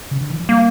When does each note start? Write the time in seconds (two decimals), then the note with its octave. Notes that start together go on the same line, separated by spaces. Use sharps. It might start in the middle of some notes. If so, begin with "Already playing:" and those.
0.11 C#3
0.21 D3
0.30 E3
0.39 F3
0.48 G3 A#3